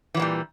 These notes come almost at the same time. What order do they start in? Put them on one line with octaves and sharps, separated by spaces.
E3 F#3 A#2 G3